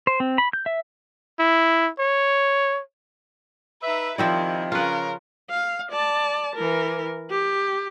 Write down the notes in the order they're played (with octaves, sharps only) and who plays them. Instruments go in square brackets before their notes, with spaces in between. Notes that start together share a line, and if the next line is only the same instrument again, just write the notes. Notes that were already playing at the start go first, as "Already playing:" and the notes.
[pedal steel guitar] C5
C4
B5
G6
E5
[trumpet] E4
C#5
[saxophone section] D#4 E5 [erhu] B4
[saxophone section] C3 D#3 [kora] F3 C4 D5 [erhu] E4
[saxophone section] C#3 [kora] F4 B4 [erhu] A#4
[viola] F5
D5 A5
E3 A#4
G4